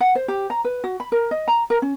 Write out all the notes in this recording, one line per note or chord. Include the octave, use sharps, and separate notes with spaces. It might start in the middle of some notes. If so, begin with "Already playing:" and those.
F#5
C5
G4
A#5
B4
F#4
B5
A#4
D#5
A#5
A#4
C#4